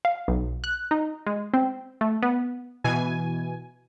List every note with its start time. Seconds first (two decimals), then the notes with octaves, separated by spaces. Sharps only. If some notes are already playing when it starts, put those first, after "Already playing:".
0.05 F5
0.28 B1
0.64 F#6
0.91 D#4
1.27 G#3
1.54 C4
2.01 A3
2.22 B3
2.84 B2 E3 G#5